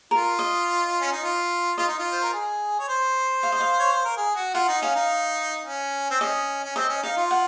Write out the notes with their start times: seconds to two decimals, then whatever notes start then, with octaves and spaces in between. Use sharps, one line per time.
0.11 F4 A#4
0.39 D#5
1.01 C#4
1.12 D#4
1.22 F4
1.77 F4 D#5
1.88 D#4
1.98 F4
2.12 C5
2.23 A#4
2.33 G#4
2.79 C#5
2.88 C5
3.43 F5
3.52 D#5
3.60 F5
3.79 C#5
3.92 C5
4.05 A#4
4.17 G#4
4.36 F#4
4.54 F4 F#5
4.68 D#4
4.82 C#4 F5
4.96 D#4
5.65 C#4
6.11 C4
6.20 C#4 D#5
6.64 C#4
6.76 C4 D#5
6.89 C#4
7.03 D#4 F5
7.17 F4
7.31 F#5